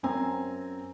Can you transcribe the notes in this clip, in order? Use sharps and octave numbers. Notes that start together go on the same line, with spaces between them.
F#2 C4 C5 G#5 A#5 E6